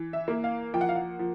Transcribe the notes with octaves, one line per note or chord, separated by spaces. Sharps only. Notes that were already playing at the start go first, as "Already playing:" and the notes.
Already playing: E3
E5
A#3
F5
F3 G5
F#5
F5
F#5
F3